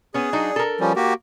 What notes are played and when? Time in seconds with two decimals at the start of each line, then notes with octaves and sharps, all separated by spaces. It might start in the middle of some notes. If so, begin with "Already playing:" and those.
0.14 B3 C#4 G#4
0.33 F#3 D4 D#4
0.56 A4 A#4
0.80 F3 G3 C#4
0.96 A#3 F#4 G4